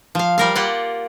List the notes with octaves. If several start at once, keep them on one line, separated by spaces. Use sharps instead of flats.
F3 F5
G3 A#4 F5
A#3 F4 G4 D5 F#5